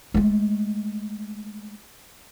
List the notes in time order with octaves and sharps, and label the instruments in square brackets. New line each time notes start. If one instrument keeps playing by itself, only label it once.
[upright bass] G#3 A3